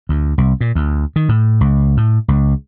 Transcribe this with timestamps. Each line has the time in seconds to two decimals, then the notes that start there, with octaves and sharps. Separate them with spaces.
0.09 D2
0.38 C2
0.61 A#2
0.75 D2
1.16 D#3
1.29 A2
1.61 C#2
1.97 A2
2.28 C#2